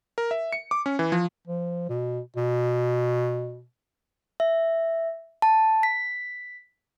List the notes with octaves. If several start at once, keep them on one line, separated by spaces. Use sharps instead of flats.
A#4
E5
C#7
D6
C#4
E3
F3
F3
B2
B2
E5
A5
B6